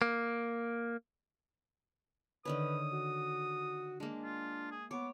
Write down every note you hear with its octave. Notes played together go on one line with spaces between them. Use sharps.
A#3
D3 D#3 B4 C#5 D#6
F#4
G#3 A#3 D4
F4
G#4
B3 C#5 D6